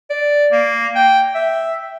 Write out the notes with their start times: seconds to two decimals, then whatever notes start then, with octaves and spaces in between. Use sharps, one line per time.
0.10 D5
0.52 A#3
0.95 G5
1.35 E5